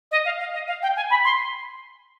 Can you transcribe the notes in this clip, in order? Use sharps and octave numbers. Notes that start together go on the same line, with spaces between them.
D#5
F5
F5
D#5
F5
G5
G#5
B5
C6